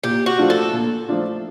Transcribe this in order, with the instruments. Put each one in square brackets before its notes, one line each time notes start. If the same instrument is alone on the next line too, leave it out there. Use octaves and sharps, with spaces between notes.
[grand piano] A#2 [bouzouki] G4
[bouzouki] F#4
[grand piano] F3 A3 D4 F4
[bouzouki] A4
[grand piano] A#2
F3 A3 D4 F4